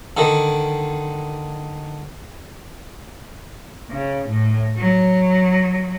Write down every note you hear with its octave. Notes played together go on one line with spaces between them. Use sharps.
D3 D#3
C#3
A2
F#3